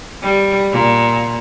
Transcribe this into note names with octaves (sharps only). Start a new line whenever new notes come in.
G3
A#2